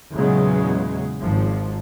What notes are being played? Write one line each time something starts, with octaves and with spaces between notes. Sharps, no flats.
E2 A#2 C#3 F#3 G#3 B3
G#1 G#2 F3